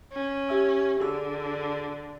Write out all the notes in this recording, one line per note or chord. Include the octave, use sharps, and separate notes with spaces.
C#4
G4 E5 E6
D3 F#4 G#4 E6